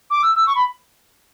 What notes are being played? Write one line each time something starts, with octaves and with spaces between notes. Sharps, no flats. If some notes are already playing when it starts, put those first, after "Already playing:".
D6
E6
E6
C#6
B5